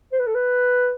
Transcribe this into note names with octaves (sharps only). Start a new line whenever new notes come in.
C5
B4
A4
B4